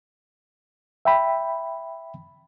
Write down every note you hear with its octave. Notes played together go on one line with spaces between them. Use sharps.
E5 G5 B5